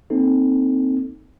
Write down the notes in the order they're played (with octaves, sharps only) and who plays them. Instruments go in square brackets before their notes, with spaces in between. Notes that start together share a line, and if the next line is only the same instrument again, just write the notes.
[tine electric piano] A#3 C4 D#4 A4